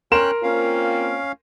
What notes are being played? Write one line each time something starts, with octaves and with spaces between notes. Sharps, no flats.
C#4 A#4 G5 C6 F#6 E7
A#3 C4 C#4 F4 F5